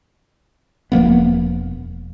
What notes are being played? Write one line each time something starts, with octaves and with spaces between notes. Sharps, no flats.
E1 F3 A#3 B3